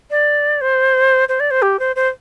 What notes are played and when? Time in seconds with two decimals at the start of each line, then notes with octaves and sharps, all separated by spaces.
0.10 D5
0.61 C5
1.28 C5
1.40 D5
1.50 C5
1.62 G4
1.79 C5
1.96 C5